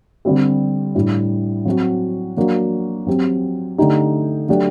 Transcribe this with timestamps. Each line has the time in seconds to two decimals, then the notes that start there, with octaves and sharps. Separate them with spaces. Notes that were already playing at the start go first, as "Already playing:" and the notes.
0.25 D3 G3 C4 G4
0.95 A2 G3 D4
1.65 F#3 C4 F#4
2.37 F#3 A#3 D4 F#4
3.07 F#3 C4 G4
3.78 D3 A3 D#4 G4
4.49 F#3 A3 D4 G4